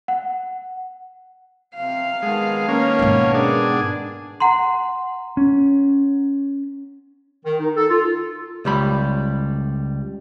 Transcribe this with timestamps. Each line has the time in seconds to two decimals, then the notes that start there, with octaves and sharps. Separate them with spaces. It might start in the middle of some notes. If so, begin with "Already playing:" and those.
0.08 F#5
1.75 C3 F5
2.22 D#3 G#3 B3 A5
2.69 A#3 C#4
2.99 G#2 B2
3.34 D4 G#4
4.40 F#5 A#5 C6
5.37 C#4
7.45 D#3
7.60 D#4
7.77 A4
7.90 F4
8.65 C#2 G3 B5